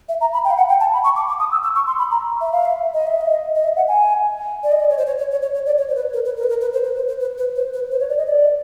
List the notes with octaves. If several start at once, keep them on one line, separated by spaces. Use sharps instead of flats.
E5
A#5
B5
G5
F5
F#5
G5
A5
B5
C#6
D6
D6
D#6
E6
E6
C#6
C6
B5
A#5
E5
F5
E5
D#5
E5
D#5
D#5
E5
F#5
G#5
D5
D#5
D5
C#5
C5
C#5
C#5
C#5
C#5
C#5
D5
C#5
C5
B4
A#4
B4
A#4
B4
A#4
B4
C5
B4
C5
C5
B4
B4
C5
B4
C5
C#5
D5
D#5
D5